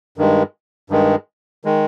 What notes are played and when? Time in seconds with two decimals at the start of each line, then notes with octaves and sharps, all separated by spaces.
0.18 G2 D#3 G#3
0.90 G2 D#3 G#3
1.65 D#3 G#3